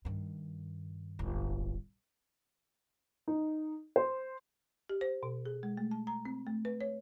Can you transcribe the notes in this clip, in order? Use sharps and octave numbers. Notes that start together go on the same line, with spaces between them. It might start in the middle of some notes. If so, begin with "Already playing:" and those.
G2 D#3
D1 G1
D#4
C5
G4
C5
B2
G#4
G#3
A3
A5
A#5
C4
A3
B4
C#5